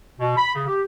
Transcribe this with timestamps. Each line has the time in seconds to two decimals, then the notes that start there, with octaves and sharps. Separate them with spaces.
0.20 B2
0.37 B5
0.55 C#3
0.67 G4